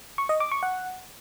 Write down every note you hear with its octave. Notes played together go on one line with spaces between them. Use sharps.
C#6
D#5
D6
C#6
F#5